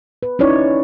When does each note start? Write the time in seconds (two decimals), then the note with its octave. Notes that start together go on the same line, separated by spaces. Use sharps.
0.23 B4
0.39 C#4 D#4 E4 C#5 D5